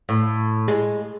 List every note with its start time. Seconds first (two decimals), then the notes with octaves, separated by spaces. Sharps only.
0.09 A2
0.68 G#3